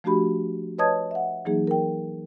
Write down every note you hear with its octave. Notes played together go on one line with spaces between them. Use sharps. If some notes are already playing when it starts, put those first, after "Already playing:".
F3 A3 D4 F#4 G4 B5
B4 C#5 D#5 A5 D#6 G#6
E5 F#5
E3 F#3 A#3 D#4 G#4
A#4 G5